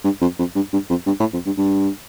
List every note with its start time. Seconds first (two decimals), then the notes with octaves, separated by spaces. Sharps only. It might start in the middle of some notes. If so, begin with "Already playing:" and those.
0.04 G2
0.21 F2
0.39 F2
0.55 G2
0.73 G2
0.90 F2
1.07 G2
1.20 A2
1.33 F2
1.46 G2
1.58 G2